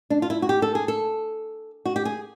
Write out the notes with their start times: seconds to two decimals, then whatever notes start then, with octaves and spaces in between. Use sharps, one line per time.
0.10 D4
0.22 F4
0.30 E4
0.42 F#4
0.49 G4
0.62 A4
0.75 G#4
0.88 A4
1.85 F#4
1.96 G4
2.05 G#4